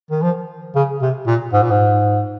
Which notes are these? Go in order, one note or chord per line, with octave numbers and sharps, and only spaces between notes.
D#3
F3
C#3
C3
A#2
G#2
A#2
G#2